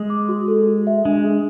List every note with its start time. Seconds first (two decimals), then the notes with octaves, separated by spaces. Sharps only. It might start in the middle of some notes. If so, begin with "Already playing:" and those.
Already playing: G#3
0.10 D6
0.29 F#4
0.48 A4
0.67 F#4
0.87 E5
1.05 G#3 D4
1.24 G#4